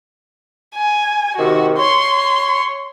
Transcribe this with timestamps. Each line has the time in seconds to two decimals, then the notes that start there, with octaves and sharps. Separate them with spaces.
0.75 G#5
1.37 C3 D#3 F#4
1.77 C#5 C6